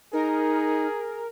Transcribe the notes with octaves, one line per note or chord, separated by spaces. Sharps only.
D#4 G#4 A#4